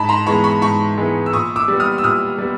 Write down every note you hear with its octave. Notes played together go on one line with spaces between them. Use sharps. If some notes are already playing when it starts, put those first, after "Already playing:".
Already playing: G#2 A5 B5
A#5 C6
E3 G#3 B3 B5 C#6
B5 C#6
G#2 B5 C#6
E3 G#3 B3
E6
A#2 C#6 D#6
D6 E6
G3 B3
D#6 F6
E6
A#2 D#6 F6
G3 B3